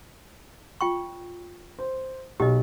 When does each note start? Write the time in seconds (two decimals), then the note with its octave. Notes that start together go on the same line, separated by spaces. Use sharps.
0.81 F4 G5 C#6
1.79 C5
2.40 B1 G4 D#5